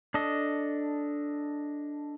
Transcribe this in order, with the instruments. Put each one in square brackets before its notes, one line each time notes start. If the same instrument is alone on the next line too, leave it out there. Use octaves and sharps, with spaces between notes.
[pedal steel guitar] D4 A4 D#5